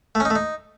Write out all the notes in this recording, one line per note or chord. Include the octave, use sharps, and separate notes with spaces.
A3
C#4
D#4
A3
D#4